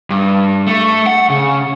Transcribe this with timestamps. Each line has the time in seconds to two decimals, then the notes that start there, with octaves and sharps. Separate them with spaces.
0.10 G2
0.67 A3
1.06 F#5
1.30 C#3